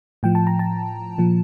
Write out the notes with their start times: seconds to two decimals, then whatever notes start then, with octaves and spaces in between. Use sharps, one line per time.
0.23 A2 F3 G5
0.35 A5
0.47 A#5
0.59 A5
1.18 A#2 F3